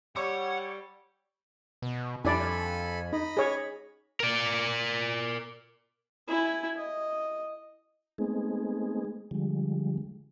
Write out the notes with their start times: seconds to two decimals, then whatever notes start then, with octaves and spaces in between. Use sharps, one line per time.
0.16 G3 C#5 F#5 C#6 D6 E6
1.82 B2
2.25 F2 D4 E4 A4 D5 G#5 B5
3.13 D#4 D#5 B5
3.37 G#4 C#5
4.20 A#4 D5
6.28 E4 G#5
6.77 D#5
8.18 G#3 A3 B3 C4 D#4 G#4
9.31 D3 F3 G3 G#3